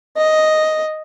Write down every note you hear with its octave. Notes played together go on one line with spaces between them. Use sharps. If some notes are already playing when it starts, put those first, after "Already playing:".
D#5